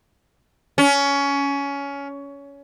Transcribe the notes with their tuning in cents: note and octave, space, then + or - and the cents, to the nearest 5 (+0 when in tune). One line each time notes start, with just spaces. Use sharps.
C#4 +20